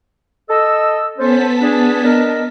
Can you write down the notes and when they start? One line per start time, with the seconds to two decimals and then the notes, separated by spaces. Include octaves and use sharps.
0.50 A4 D#5 E6
1.18 B3 C#4 A4 C5 A5 B6
1.61 D4 G#4
2.04 D4 A#4 D#5